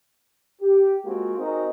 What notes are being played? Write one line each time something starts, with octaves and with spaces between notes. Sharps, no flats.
G4
G#3 A#3 C4 F4 F#4
C4 D#4 F#4 G#4 A#4 D#5